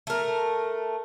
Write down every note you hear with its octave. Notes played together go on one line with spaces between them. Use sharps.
A3 A#4